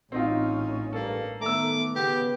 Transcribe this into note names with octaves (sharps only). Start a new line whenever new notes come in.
A1 C4 C#4 D#4 F4
G2 A#3 A4
D#3 A3 B3 A#5 D6 E6
C#3 B3 G4